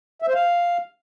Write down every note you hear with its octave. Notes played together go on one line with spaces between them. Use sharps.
E5
C5
F5